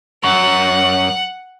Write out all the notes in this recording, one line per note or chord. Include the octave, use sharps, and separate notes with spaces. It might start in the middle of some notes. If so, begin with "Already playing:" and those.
F#2 F#5